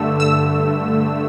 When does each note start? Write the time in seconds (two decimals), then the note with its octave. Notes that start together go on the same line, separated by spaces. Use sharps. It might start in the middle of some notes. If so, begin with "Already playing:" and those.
Already playing: G2 D3 A3 E6
0.20 E6